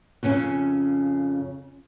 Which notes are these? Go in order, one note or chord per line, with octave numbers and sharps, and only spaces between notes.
F2 C#3 C#4